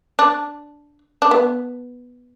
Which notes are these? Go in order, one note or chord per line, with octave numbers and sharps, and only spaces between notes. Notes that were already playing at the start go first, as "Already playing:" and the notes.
D4
D4
B3